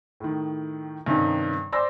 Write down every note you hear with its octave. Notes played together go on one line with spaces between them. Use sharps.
A2 D#3
G2 C3 D#3 C#4 D#4
C5 D5 G#5 C6 E6 A#6